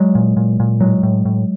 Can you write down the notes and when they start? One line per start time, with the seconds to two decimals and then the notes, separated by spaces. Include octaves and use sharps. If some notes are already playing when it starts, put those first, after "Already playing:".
Already playing: F#3 G#3
0.15 A#2
0.37 A#2
0.60 A#2
0.81 A2 F#3 G#3
1.03 A2
1.25 A2